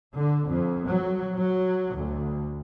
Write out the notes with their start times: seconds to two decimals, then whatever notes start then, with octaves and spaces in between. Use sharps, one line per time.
0.16 D3
0.47 F2
0.87 F#3
1.36 F#3
1.95 D2